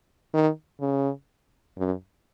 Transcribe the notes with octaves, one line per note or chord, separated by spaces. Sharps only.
D#3
C#3
F#2